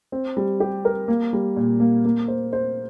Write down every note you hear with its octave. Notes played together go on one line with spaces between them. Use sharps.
C4
G3
G4
A#4
A#3
G3
A#2
A#3
A#3
C5
C5